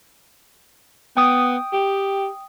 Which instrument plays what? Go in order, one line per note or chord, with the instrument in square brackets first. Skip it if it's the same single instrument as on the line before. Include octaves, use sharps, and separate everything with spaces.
[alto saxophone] B3 [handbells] G5 D#6
[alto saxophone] G4